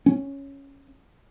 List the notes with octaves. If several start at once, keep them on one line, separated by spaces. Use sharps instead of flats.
C#4